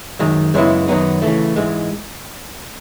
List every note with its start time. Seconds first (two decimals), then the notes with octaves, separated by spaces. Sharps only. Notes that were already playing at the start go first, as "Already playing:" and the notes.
0.19 F#2 D#3 G#3
0.54 F#2 C#3 G#3 B3 E4
0.88 F#2 D#3 F#3 B3 D#4
1.22 C#3 E3 A3
1.56 G#2 E3 G#3